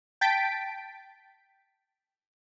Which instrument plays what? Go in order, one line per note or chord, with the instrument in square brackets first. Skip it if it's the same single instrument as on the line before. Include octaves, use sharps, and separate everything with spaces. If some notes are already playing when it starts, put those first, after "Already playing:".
[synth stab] G5 A5 G6 A6 B6 D7